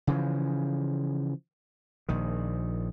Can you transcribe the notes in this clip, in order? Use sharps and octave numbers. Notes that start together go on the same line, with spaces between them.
C#3 E3 F3
A#1 D#3